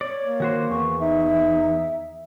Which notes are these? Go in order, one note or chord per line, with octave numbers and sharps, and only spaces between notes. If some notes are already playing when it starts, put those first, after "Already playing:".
C#5 D5
A#3
D#3 F#4 C5
E2 C#6
D#4 E5